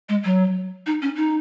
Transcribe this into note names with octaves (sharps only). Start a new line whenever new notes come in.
G#3
F#3
D#4
C#4
D#4